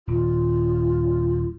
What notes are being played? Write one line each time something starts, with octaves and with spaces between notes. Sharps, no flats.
D#1 F4